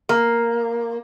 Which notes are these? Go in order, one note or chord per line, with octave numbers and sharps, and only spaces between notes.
A#3